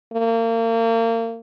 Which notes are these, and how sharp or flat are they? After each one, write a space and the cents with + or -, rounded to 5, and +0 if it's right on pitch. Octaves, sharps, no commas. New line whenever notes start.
A#3 -35